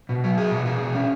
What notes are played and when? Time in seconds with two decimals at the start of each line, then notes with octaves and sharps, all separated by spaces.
0.09 B2
0.24 F#3
0.38 G#4
0.51 B2
0.66 G#4
0.81 B2
0.95 C#4